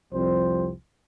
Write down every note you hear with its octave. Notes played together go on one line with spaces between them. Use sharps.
C2 F2 F3 G3 C4 C5